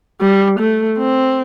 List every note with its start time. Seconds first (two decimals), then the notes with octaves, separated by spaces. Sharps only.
0.21 G3
0.59 A3
0.98 C4